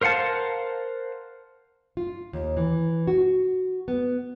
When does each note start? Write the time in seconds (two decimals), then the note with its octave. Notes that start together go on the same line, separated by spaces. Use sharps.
0.01 A#4 C5 F5 F#5 A5
1.97 F4
2.33 D#2
2.57 E3
3.07 F#4
3.88 B3